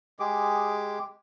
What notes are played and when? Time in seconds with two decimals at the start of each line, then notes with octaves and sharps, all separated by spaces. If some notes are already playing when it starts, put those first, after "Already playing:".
0.20 G#3 G4 G#4 D6